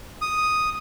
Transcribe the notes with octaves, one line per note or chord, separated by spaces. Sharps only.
D#6